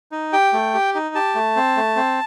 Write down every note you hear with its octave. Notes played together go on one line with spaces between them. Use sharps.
D#4
G4 G5
A3
G4
D#4
G4 A5
A3
C4
A3
C4